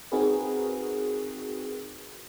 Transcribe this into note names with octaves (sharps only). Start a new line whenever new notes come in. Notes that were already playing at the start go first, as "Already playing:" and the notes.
C4 D#4 F#4 G#4 A#4 B4